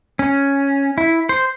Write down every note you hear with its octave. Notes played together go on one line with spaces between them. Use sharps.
C#4
E4
C5